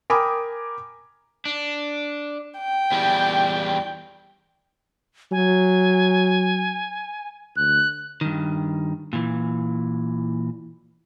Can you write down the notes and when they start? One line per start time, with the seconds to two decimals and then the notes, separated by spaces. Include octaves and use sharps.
0.10 A#4 G5 G#5 B5 D6 D#6
1.45 D4
2.60 G5
2.92 E2 G3
5.32 F#3 G#5
7.57 D2 F#6
8.21 G2 D#3
9.13 A#2 E3